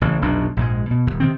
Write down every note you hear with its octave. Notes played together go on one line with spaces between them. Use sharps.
A1 C#3 E3
F1 B1 B2 D4
A#1 G#2 G#3
B2
D#1 D#2
C3 D#3 C4